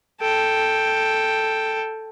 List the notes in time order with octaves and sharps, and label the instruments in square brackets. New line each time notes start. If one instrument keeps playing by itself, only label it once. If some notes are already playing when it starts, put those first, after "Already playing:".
[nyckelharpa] A4 G5